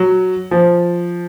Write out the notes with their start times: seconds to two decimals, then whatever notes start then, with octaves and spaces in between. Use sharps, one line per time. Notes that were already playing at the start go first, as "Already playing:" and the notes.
Already playing: F#3
0.51 F3